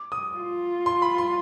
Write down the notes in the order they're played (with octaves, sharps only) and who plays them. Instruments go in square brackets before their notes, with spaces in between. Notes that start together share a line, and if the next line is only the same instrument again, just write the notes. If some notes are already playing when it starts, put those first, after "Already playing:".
Already playing: [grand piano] D6
D#6
[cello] F4
[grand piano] C6
B5
C6